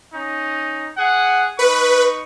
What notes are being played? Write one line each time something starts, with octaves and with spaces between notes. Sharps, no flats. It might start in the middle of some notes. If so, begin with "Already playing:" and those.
C#4 D#4
G#4 F#5
D#4 B4 C#6